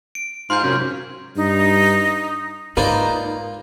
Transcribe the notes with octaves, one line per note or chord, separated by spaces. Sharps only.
D7
G#2 F4 F5 C6 G6
F#2 C3 C#4
G2 D#4
G#2 A#3 D#4 F4 B4 C5 D5